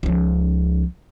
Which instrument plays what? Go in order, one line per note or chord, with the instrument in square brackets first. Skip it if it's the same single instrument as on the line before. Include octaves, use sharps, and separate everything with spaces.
[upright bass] C#2 F3